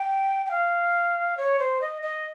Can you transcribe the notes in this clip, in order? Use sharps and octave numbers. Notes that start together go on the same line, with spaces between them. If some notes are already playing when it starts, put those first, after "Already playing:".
Already playing: G5
G5
F5
C#5
C5
D#5
D#5